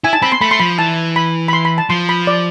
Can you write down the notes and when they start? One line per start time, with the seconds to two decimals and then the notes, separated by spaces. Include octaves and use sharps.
0.04 E4 G#5
0.13 A5
0.22 C4 B5
0.32 C6
0.41 A3 B5
0.51 C6
0.60 F3 B5
0.78 E3 A5
1.16 B5
1.48 B5
1.53 C6
1.65 B5
1.78 A5
1.90 F3 C6
2.09 B5
2.27 D5